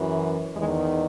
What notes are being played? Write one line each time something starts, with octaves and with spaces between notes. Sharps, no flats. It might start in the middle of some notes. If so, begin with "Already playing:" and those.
Already playing: F#2 E3
E2 D#3 G#3